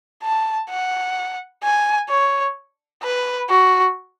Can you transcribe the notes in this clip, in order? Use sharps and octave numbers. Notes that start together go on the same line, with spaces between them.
A5
F#5
G#5
C#5
B4
F#4